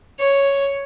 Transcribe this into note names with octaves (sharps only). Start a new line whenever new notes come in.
C#5